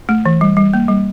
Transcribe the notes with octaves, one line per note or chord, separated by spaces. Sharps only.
A3
E3
G3
G3
A#3
G3